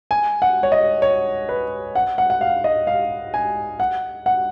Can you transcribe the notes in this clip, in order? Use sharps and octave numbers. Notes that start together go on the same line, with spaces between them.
G#5
F#5
C#5
D#5
C#5
B4
F#5
F#5
F#5
F5
D#5
F5
G#5
F#5
F#5